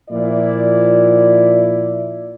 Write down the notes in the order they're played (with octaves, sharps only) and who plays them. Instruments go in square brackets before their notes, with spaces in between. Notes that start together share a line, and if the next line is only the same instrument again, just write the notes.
[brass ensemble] A#2 F3 E4 D5